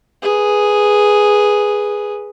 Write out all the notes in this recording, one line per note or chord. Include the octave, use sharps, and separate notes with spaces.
G#4 B4